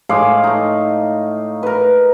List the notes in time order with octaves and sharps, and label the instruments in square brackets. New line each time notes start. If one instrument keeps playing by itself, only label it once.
[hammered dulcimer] A2 G#3 F5 D6
A3 D#4
A#4 B4